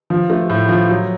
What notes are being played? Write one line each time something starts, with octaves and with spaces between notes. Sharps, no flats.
F3
A3
A2
F3
F#3